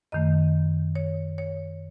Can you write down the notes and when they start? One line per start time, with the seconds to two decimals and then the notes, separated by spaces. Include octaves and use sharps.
0.12 F#2 D#3 A3 D#5
0.95 C#5
1.38 C#5